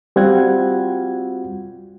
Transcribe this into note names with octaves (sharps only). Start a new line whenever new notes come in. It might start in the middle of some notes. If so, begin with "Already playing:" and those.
G3 C4 F4 F#4 F#5 G#6